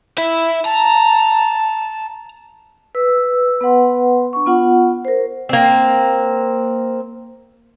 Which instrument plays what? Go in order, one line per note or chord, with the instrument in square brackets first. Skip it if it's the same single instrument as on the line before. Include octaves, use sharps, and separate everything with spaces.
[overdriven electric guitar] E4 E5
[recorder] A5 [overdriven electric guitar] A#5
[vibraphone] B4 E6
B3 B4 F#5 C6
D4 C#6
B3 F4 F#5
A#4 C5
[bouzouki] A#3 C4